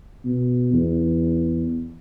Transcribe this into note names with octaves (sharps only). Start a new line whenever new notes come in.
B2
E2